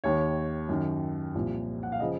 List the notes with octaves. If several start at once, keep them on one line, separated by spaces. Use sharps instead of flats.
D#2 D#3 C#5
F#2 D#3
C2 A#2 F3
F#5
F5
C#3 F3 D#5